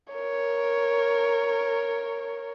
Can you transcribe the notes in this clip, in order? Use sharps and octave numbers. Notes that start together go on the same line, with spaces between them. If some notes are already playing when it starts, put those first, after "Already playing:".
A#4 C#5